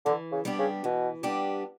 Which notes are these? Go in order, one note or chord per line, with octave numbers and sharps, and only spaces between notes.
D3 E3
C#3
G3 B3 D4 G4
C#3
B2 E3
G3 B3 D4 G4